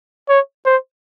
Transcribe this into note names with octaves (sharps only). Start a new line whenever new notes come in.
C#5
C5